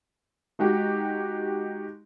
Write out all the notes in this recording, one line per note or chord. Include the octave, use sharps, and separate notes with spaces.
G#3 D#4 F#4 G4